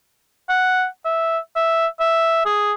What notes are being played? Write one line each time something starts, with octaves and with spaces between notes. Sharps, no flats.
F#5
E5
E5
E5
G#4